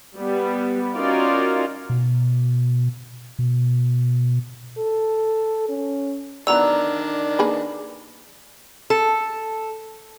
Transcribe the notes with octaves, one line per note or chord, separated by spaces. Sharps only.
G3 B3
C#4 D#4 F4 F#4 A#4 D5
B2
B2
A4
C#4
D#3 E3 F#3 B3 D4 D5 A#5 E6
A#3 G#4 B4
A4